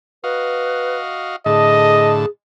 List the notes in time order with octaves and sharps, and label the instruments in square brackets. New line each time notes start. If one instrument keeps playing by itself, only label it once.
[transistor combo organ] F#4 D#5 F5 [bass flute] B4
[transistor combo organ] A2 D3 A5 [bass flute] G#4 [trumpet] D#5